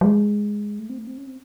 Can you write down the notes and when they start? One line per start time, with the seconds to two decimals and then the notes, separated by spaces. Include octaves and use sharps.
0.01 F#3
0.04 G#3
0.79 A3
0.90 C4
0.98 A3
1.07 C4
1.18 C#4
1.27 C4